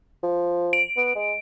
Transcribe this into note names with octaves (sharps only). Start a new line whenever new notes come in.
F3
D7
B3
G#3